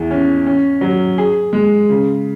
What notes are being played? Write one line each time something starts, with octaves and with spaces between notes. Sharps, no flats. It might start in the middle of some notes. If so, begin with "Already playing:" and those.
Already playing: E2 E3
C#4
C#4
F#3
G#4
G#3
C#3